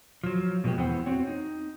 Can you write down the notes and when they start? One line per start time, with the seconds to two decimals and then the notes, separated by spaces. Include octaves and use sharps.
0.24 F3 F#3
0.64 B2 F3 G#3 B3 G4
0.77 E2 B3 E4 C5 F#5 G5
1.06 C4 F#4 C#5
1.27 D#4